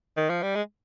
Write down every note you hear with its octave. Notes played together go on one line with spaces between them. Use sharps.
D#3
F3
G3
G#3